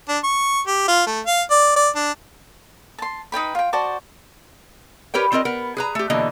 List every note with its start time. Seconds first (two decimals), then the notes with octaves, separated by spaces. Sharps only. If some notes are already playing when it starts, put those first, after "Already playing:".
0.09 D4
0.24 C#6
0.67 G4
0.88 F4
1.06 A3
1.26 F5
1.50 D5
1.76 D5
1.95 D4
2.98 A5 C6
3.32 D#4 B4 G5 B5
3.55 F4 G5
3.73 F#4 C5 D5 A5
5.14 G4 A#4 B4 C#5 G5
5.32 G3 C4 F4 A#4 D#5
5.45 B3 A#4
5.77 G#4 B4 A#5
5.95 A3 G4
6.10 B2 D3 E3 A#3 D#5